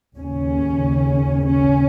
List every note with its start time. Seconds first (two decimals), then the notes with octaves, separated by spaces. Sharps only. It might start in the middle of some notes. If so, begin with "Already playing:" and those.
0.17 D#2 C#3 C#4
1.45 C#4